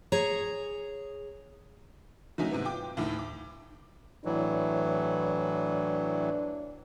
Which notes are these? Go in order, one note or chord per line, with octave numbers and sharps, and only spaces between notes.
G#4 C#5 A#5
D#3 F#3 A3 C#4 D#4
G#2 C3 B3
F4 G5 D6
D2 A2 D#3
D6
A2 E3 F#3 D4